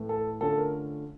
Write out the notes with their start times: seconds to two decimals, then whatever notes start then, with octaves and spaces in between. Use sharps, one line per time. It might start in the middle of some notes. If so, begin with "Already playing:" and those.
Already playing: A2 E3 A3
0.09 A4
0.41 D3 A3 C#4 F4 A4
0.57 A#4